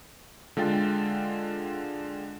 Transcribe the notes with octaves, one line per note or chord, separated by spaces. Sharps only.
D3 G#3 F4 G5 A6